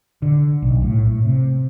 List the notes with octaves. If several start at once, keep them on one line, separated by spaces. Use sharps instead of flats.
D3
B1
A2
A2
C3